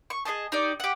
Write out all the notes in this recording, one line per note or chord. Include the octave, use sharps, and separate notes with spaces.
C#6
G#4 C5 D#5 A5
D#4 G4 D5
G4 F#5